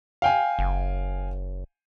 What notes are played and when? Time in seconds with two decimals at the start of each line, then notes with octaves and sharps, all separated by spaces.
0.22 F5 G5 G#5
0.59 F#1